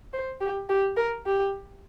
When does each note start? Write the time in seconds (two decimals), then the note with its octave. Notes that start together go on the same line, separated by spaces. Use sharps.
0.13 C5
0.41 G4
0.69 G4
0.97 A#4
1.26 G4